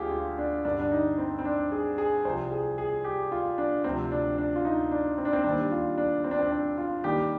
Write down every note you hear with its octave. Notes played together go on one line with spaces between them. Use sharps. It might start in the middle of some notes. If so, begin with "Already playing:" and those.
Already playing: D2 D3 F3 F4 G4 G#4
F4
D4
G2 D3 G3 D4
D4
D#4
C4
C4
D4
G#4
G#4
C2 C3 F3 C5
G#4
G#4
G4
F4
D4
D2 C3 F3 C4
D4
D4
F4
D#4
D4
C4
D4
C4
D#2 D#3 G3 D4
F4
D4
C4
D4
C4
D4
F4
D#2 D#3 G3 G4